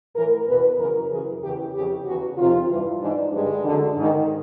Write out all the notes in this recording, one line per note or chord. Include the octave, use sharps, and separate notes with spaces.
A2 E3 A#4
E2 B2 B4
F#2 C#3 E3 A#4
F#2 C#3 E3 G#4
E2 C#3 E3 G4
F2 C#3 E3 G4
E2 C#3 E3 F#4
F2 C3 D#3 F4
G2 E3
G#2 E3 D4
G2 D3 G#3
F#2 D3
G#2 D#3